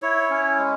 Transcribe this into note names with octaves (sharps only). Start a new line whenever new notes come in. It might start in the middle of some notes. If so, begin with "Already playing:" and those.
E4 C#5
C#4
G#3